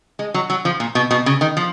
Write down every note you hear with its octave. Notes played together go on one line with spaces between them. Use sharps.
G#3
F#3
F#3
F3
A#2
B2
B2
C#3
D#3
F3